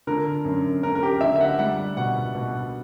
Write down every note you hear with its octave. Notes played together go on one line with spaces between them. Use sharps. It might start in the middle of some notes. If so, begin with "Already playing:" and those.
D3 A#4
F#2
F#2 A#4
A#4
G4
D3 E5
E5
F#5
G3 F#5
B2 F#5
B2